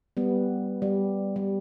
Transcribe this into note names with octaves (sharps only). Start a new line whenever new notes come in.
G3 B3
G3
G3